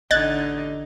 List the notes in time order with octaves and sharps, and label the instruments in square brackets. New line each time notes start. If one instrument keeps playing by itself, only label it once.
[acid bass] A1 [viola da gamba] D3 D#4 [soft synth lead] D#5 [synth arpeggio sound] F#6 G#6 A6